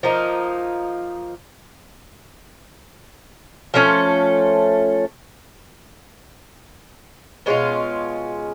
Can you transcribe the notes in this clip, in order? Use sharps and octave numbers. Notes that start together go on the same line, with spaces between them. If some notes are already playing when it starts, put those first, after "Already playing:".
F3 A#3 D#4
F3 A3 C#4
B2 G#3 C#4 F4